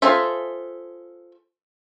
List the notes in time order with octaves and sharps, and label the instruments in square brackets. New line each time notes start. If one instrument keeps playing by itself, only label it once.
[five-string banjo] F4 G#4 A4 C5 E5